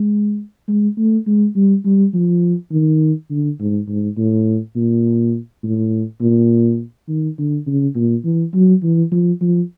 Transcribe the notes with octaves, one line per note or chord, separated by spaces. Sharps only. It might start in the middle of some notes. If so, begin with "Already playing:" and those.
Already playing: G#3
G#3
A3
G#3
G3
G3
F3
D#3
D3
G#2
G#2
A2
A#2
A2
A#2
D#3
D3
C#3
A#2
E3
F#3
E3
F3
F3